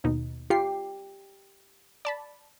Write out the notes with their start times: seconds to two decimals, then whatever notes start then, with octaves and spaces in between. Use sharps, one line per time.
0.04 D#2 B2 D#4
0.50 F4 G4 C7
2.05 D5 A5 B5